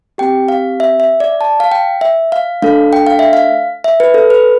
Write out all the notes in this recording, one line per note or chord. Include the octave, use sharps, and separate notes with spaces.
C4 G4 G5
F5
E5
E5
D5
A5
F5
G5
E5
F5
A3 D4 A4 F5
G5
F5
E5
F5
E5
B4
A4
B4